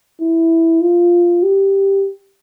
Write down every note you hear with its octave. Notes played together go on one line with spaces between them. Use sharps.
E4
F4
G4